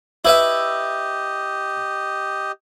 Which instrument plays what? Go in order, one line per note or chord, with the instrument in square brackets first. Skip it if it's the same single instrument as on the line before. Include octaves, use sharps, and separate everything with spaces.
[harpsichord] E4 B4 E5 [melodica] G4 D#5